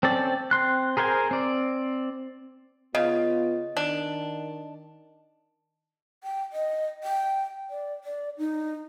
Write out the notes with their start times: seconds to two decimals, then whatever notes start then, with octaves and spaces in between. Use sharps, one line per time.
0.03 C4 C#4 A4 D5
0.51 C4 C6 F#6
0.97 G#4 A#4 C5 C#5 G#5
1.31 C4 D5
2.95 C#3 B3 F4 D#5
3.77 D#3 D4
6.24 G5
6.53 D#5
7.04 G5
7.70 D5
8.04 D5
8.38 D#4